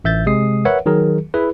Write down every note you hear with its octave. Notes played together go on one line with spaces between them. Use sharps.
A1 E5 G6 A6
C3 G#3 D#6 C7
A#4 B4 C#5 E5 F#5
D#3 F#3 G#4 A#4
E4 G#4 B4